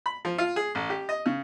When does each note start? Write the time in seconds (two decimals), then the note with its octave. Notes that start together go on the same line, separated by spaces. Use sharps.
0.06 B5
0.25 F3
0.38 F4
0.56 G#4
0.75 A1
0.90 G4
1.09 D#5
1.26 C#3